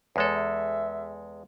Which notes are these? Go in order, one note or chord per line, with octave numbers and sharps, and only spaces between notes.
E2 G#3 A4 C#5
E5